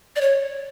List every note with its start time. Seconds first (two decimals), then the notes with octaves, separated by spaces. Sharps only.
0.16 D5
0.21 C#5